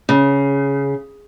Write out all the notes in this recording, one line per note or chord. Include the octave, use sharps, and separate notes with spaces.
C#3